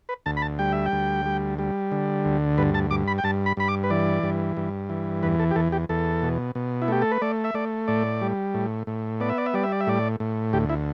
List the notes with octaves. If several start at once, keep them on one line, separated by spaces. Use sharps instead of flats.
B4
D2 A5
B5
A5
G3 G5
E5
G5
D2
G3
G3
D3
D2
G2 B4
A5
G2 D6
B5
G5
G2 A5
B5
G2 B5
D6
B4
E3 D5
G2
G2
E3
E2 B4
A4
G4
E2 A4
G4
E2 A4
B2
B2
E4
A3 G4
A4
B4
A3 D5
E5
A3 D5
A2 D5
G3
A2
A2
B3 D5
E5
D5
E5
G3 D5
E5
D5
E5
A2 D5
A2
D2 G4
E4